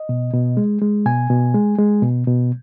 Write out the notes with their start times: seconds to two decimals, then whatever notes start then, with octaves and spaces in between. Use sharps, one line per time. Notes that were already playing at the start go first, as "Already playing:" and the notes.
Already playing: D#5
0.09 B2
0.34 B2
0.57 G#3
0.82 G#3
1.06 B2 G#5
1.30 B2
1.54 G#3
1.78 G#3
2.02 B2
2.27 B2